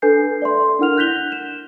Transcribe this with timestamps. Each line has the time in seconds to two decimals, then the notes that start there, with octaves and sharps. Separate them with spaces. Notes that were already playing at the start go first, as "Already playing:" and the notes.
0.02 D4 A4 B4 G#5 G6 C7
0.42 D5 E5 C6
0.79 D4 E4 A#4 F#5 F6 F7
0.97 F#6 G6 A#6 B6 F7 G7
1.32 E7